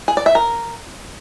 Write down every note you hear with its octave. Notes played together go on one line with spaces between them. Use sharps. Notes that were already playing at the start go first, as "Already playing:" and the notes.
G#4
D5
E5
A#4